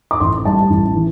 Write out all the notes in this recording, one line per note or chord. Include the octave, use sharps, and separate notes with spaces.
D6
A1 C6
G3 A5
A1
E3